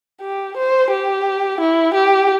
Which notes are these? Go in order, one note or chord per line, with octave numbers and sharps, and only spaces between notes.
G4
C5
G4
E4
G4